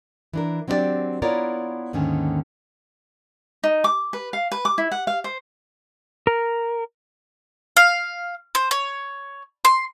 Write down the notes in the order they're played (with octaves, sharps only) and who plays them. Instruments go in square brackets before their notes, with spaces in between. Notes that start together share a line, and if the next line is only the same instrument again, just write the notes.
[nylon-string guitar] E3 D4 A#4
F#3 C4 D4 E4 G4 D5
B3 E4 F4 A#4 C#5 D5
D#2 G#2 D3 D#3 A#3 C#4
[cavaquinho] D#4
D6
B4
F5
B4
D6
E4
F#5
F5
C5
[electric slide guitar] A#4
[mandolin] F5
C5
C#5
C6